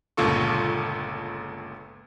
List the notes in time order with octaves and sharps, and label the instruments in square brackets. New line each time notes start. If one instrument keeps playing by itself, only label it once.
[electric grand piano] G1 C#2 A#2 F4 A4 C#6